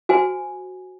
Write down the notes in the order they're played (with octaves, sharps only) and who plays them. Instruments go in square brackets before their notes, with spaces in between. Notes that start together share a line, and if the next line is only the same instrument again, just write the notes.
[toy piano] F#4 C5 G#5